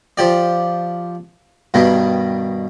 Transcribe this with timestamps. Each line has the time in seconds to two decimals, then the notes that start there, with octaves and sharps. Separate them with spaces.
0.18 F3 G4 D5
1.74 G2 B2 D#3